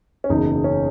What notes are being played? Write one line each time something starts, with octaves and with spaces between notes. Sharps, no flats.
C#4
F#1 E2 B2 D#4
C#4